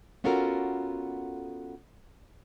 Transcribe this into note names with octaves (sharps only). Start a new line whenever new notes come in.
B3 C#4 F4 F#4 A4 A#4